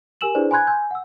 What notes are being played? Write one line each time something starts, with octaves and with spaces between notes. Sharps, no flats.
G4 A#4 G#5 E6 E7 F#7
D4 E4 G#4 B4 C5 D5
G#5 B5 C6 F#6 G#6
G#5 E6 G6
F#5 E6